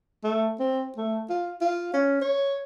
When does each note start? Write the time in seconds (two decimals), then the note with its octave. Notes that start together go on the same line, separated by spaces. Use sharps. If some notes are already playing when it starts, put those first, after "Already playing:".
0.24 A3
0.60 C4
0.97 A3
1.30 F4
1.61 F4
1.94 C#4
2.21 C#5